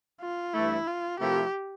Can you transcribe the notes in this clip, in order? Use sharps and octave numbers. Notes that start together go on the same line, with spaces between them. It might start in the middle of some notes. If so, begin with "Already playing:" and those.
F4
G2 E3 A3 E4
F4
C3 F3 A3 E4 G4 A#4